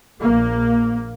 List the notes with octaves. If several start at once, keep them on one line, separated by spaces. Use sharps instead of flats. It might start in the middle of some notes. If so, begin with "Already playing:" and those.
A#1 A#2 A#3